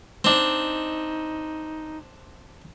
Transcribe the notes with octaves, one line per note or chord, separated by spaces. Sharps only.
C4 D4 D#4